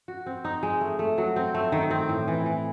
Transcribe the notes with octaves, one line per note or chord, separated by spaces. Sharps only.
F#4
C4
D#4
G#3
A3
A3
F#3
C4
A3
D#3
C4
A2
E3
E3